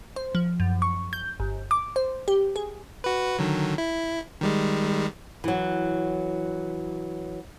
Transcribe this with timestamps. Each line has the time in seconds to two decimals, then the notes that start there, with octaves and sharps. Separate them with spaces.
0.16 C5
0.35 F3
0.60 F#2
0.82 C#6
1.13 G6
1.40 G1
1.71 D6
1.96 C5
2.28 G4
2.56 G#4
3.04 F#4 B4
3.39 D3 D#3 F#3
3.78 E4
4.41 D#3 G3 G#3
5.44 E3 F#3